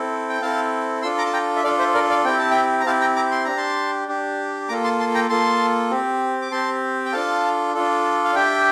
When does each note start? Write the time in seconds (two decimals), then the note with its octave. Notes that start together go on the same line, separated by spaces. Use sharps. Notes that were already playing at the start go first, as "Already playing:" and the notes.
Already playing: C4 E4 A4
0.29 G5
0.41 C4 E4 A4 F5 A5
1.02 D4 F4 A4 C6 E6
1.18 A#5 D6
1.26 A5
1.33 G5 A#5
1.56 E5
1.64 D4 F4 A4 D5 F5
1.79 C5 E5
1.94 A#4 D5
2.10 D5 F5
2.25 C4 E4 G4 G5
2.39 A5
2.51 E5 G5
2.80 A#5
2.86 C4 E4 G4 F5 A5
3.01 G5 A#5
3.16 A#5 D6
3.31 C6
3.45 D4 G4 A#5
3.57 A5 C6
4.08 D4 G4
4.68 A#3 F4 A4 A#5 D6
4.84 A5 C6
5.00 A5 C6
5.15 G5 A#5
5.29 A#3 F4 A4 A5 C6
5.91 C4 G4
6.42 D6
6.52 C4 G4 A5 C6
7.06 G5
7.13 D4 F4 A4 F5 A5
7.74 D4 F4 A4
8.24 F5
8.35 D4 G4 E5 G5